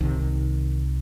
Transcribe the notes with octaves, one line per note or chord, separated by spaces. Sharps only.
C2 C3 D#3